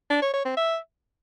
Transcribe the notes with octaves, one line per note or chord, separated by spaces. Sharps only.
D4
C#5
C#5
C4
E5